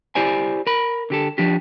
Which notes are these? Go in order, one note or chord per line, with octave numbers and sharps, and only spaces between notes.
E4 G4 C5 D5 G#5
A#4 B5
D3 G4 A4
F3 D4 G4